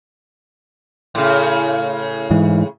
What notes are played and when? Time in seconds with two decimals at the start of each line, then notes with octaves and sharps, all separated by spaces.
1.15 A2 C#3
2.31 G#2 E3